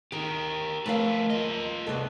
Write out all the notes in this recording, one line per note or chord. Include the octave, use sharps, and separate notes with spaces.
D#3 G4 A#4
F3 A3 A#4 B4 F5
A#3 F4 D#5
C2 B3 A4